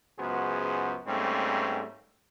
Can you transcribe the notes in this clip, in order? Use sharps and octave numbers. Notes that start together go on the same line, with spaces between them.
C#2 F#2 B3 F#4 G#4 C5
G#2 G3 A3 A#3 C4 C#4